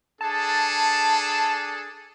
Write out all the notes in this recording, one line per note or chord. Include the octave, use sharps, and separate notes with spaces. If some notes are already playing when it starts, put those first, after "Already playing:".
D4 G#4 A4 A5